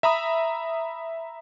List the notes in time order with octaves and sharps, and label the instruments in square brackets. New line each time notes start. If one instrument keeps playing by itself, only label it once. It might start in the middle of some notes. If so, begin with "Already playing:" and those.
[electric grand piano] E5 A#5 B5 D#6